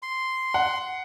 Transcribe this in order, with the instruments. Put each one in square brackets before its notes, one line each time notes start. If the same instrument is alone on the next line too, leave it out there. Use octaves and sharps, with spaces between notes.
[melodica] C6
[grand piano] F#5